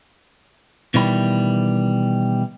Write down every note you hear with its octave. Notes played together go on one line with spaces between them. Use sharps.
B2 D#3 E3 G3 B5